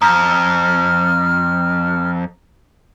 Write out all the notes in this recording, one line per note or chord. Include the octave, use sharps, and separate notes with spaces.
F2 A#5 F6